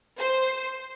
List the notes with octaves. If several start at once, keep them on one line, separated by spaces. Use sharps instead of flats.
C5